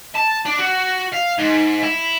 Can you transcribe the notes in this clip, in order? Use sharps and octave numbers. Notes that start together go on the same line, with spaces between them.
A5
D4
F#4
F5
G#2
E4